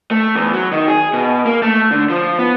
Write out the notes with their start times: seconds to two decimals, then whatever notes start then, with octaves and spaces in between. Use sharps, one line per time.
0.11 A3
0.36 E2
0.54 F#3
0.72 D#3
0.88 G#4
1.13 B2
1.45 A#3
1.62 A3
1.91 D3
2.10 F3
2.39 B3